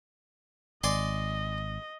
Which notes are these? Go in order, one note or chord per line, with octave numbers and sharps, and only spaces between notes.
G#1 D5 D#5 G#5 C6